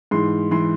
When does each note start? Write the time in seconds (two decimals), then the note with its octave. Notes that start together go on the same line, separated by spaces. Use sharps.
0.11 G#2 E3 C6
0.51 E3 C6